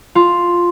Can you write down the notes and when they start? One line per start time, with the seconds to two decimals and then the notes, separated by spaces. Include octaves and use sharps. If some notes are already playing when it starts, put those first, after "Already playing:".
0.15 F4